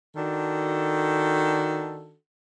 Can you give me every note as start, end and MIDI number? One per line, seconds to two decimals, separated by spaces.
0.16 2.14 51
0.16 2.14 62
0.16 2.14 66
0.16 2.14 69